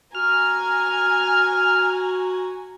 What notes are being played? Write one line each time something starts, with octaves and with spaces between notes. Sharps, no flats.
F#4 G#5 A#5 F6